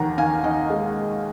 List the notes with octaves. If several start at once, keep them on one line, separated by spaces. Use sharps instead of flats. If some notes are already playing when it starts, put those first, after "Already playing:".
Already playing: D#2 D#3 F#5 A#5
D#3 F5 G#5
D#3 D#5 F#5
G#3